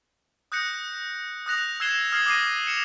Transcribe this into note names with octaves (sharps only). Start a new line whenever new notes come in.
D#6 F#6 G6 A#6 C#7
D#6 F#6 A#6 F7
E6 F#6 G#6 C7 E7 G7
D#6 F6 G#6 C7 F#7
D6 D#6 A#6 C7 D#7
C#7 E7 F7